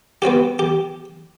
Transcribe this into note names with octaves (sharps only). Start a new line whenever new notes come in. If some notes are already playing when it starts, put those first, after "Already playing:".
B3 C4 F#4 G4
G4